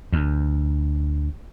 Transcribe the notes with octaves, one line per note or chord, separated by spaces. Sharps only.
D2